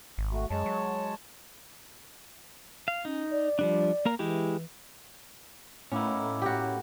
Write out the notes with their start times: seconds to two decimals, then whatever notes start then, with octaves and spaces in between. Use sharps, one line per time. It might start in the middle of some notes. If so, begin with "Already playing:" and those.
0.18 G#1
0.32 A3 F#4
0.51 F#2 G#3 C#5 A5
0.66 F#3
2.88 F5
3.05 C#4 D#4
3.30 D5
3.59 F3 G3 D4
4.05 A#3 A#4 A#5
4.19 E3 G#3 E4 G4
5.92 A2 D#3 A#3 B3 C#4 E4
6.42 F#4 G4